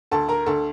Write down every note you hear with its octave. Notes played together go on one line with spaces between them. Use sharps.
D2 A4 A5
A#4 A#5
D2 A4 A5